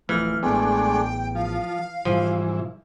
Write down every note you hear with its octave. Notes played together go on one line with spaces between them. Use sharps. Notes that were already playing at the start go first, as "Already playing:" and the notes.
D1 E3 F3 A3 F6
A1 G#3 A3 B3 D4 G5
F3 F5
G#2 B2 E3 F3 G3